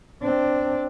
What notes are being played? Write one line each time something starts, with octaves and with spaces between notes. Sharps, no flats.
C4 D4